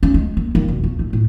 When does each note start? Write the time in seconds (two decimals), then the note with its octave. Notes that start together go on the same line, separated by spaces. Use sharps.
0.03 C#4
0.14 G#3
0.37 A#3
0.55 D#3
0.68 E1
0.84 A3
0.99 A2
1.13 A2